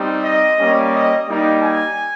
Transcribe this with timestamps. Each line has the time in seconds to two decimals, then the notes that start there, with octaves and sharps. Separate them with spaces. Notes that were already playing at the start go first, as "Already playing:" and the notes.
Already playing: G3 C4 D#4
0.24 D#5
0.59 G3 A#3 C#4
0.94 D#5
1.28 G3 A#3 D#4
1.62 G#5